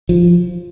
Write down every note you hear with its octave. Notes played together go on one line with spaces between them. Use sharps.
F3